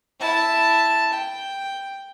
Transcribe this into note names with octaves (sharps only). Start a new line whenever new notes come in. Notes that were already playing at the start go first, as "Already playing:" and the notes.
E4 A5
G5